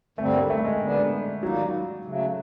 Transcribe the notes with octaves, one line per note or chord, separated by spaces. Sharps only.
G2 D3 G3 A3 C4
A#3
A3
G#3
D3 G3 B3 D4
D#3 F#3 G3 A#3 D#4
C#3 F#3 A3